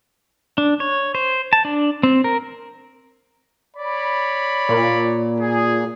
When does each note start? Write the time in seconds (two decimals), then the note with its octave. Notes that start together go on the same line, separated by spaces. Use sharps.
0.58 D4
0.80 C#5
1.15 C5
1.53 A5
1.65 D4
2.03 C4
2.24 A#4
3.77 C#5 D5 B5
4.69 A#2
5.41 G#4